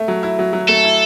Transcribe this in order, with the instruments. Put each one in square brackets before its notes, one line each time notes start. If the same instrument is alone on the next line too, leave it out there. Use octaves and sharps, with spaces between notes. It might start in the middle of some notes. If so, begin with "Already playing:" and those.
Already playing: [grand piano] A3
F#3
E4
F#3
F#3
[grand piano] A3 [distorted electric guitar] A4
[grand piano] E4